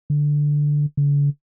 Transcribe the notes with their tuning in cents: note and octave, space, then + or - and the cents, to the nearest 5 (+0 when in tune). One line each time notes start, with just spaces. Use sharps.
D3 +0
D3 -45